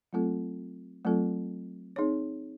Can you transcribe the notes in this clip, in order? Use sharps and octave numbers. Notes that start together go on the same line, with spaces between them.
F#3 A3 C4 F4 A4
F#3 A3 C4 F4 A4
C4 D#4 G#4 C#5